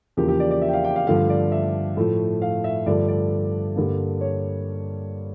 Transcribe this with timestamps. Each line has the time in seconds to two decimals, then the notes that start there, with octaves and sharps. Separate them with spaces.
0.17 E2 C#3 F3 A#3 G4
0.28 G4
0.40 D5
0.51 D5
0.62 E5
0.68 G5
0.73 F5
0.84 G5
0.96 F5
1.07 G2 D3 F3 A3 F5
1.30 D5
1.52 E5
1.97 A2 F3 A3
2.42 F5
2.64 E5
2.86 G2 D3 F3 A3 D5
3.08 D5
3.76 G2 D3 G3 A#3
4.21 C#5